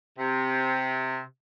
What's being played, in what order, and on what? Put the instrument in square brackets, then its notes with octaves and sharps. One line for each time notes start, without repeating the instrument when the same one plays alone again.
[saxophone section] C3